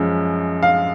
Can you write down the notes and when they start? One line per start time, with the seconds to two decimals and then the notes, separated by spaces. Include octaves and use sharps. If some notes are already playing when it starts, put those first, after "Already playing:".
Already playing: F#2 F3 G#3
0.63 F5